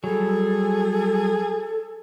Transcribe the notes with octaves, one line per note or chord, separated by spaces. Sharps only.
F#3 G3 G#4 A4